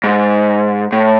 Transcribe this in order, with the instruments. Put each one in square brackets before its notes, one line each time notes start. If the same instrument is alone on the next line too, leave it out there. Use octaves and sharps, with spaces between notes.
[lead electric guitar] G#2
A2